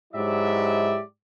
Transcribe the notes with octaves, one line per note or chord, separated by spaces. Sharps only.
G#2 F#3 E4 G4 D5 E5